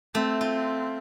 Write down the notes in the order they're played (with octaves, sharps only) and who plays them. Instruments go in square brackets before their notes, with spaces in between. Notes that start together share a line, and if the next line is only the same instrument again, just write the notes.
[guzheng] A3 [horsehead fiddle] C4
[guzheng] F4